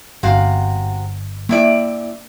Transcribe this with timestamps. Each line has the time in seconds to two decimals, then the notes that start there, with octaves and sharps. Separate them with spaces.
0.23 G1 C3 F#4 F5
1.49 G2 A#3 E4 D5